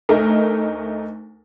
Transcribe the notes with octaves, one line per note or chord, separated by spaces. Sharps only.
D2 A3 D#4 A#4